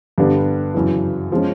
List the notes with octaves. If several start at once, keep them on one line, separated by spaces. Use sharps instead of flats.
G2 D3 G3 B3 D4
F#2 C#3 E3
F3 G#3 C#4